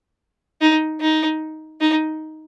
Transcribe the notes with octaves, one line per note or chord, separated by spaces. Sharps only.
D#4
D#4
D#4